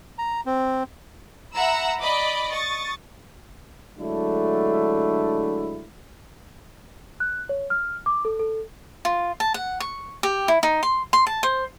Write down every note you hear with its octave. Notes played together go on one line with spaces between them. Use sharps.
A#5
C4
E5 F#5 A#5 B5 E6
D5 D#5 B5 D6
C#6 D#6 A6
D3 F#3 G#3 A3 D4 E4
F#6
C#5
F6
D6
A4
A4
F4
A5
F#5
C#6
G4
E4
D#4
C6
C6
A5
C5